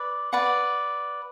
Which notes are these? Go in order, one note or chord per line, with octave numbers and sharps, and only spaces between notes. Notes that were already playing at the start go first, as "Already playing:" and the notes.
Already playing: B4 D5
B4 D5 F#5